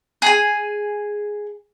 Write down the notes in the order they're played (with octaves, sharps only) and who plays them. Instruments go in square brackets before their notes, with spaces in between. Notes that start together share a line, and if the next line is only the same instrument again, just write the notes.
[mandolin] G#4 G#5